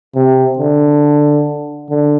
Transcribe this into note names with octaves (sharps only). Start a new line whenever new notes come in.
C3
D3
D3